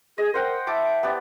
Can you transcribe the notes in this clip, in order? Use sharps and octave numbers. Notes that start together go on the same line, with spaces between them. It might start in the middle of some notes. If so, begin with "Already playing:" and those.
G#4 D#5
A#4 C5 F#5 G5
E4 E5 A5 D6
B3 G4 D5